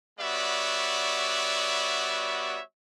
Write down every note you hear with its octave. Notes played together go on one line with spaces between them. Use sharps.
G3 B3 F#4 C#5 D5 E5